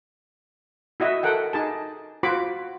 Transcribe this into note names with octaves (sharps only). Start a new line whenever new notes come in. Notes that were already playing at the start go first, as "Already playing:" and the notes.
E4 F#4 D#5 E5
A4 A#4 F#5 G5
D#4 G#4 A5
F4 F#4 C5 B5 D6